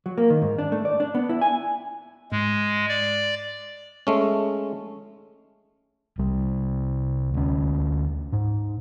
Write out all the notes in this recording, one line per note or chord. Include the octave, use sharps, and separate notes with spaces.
F#3
A#3
D#3
G#2
D4
A3
D5
D4
B3
E4
G#5
G#2 G#3
D5
G#3 A3 C#4
C2 C3 G3
D2 C#4
G#2